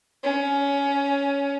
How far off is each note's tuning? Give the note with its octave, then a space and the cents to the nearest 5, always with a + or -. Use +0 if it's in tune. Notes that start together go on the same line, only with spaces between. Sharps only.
C#4 +15